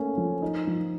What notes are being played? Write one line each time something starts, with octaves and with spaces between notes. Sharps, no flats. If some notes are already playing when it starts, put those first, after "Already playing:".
Already playing: A3 A#3 C#4
F3
D#4
F3